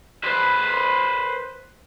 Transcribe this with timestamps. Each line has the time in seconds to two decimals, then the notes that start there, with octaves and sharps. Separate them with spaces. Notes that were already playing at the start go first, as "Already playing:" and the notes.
0.24 B4 C5